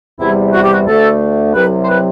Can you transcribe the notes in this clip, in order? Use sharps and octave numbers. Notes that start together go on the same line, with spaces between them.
E2 C3 G3 E4
F#4
G4
F#4
D2 D3 A3 A4
C2 C3 F#3 B4
C5
B4